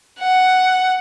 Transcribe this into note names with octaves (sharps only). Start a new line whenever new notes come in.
F#5